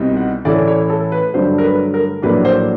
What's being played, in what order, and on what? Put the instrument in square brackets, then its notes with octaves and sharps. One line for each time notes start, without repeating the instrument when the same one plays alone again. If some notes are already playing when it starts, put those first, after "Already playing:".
Already playing: [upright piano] C2 B2 G3 C4 D#4
F#5
A2 E3 A3 C#4 E4 D5
C#5
A4
B4
G2 D3 F#3 A3 C5
A#4
B4
A#4
A#1 A2 F#3 A#3 D4 B4
C5